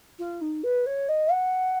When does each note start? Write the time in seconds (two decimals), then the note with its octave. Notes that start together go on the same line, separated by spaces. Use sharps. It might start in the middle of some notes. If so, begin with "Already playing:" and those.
0.18 F4
0.41 D#4
0.63 B4
0.86 C#5
1.08 D#5
1.31 F#5